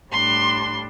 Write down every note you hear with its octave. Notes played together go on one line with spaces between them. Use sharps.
A2 G3 D4 C6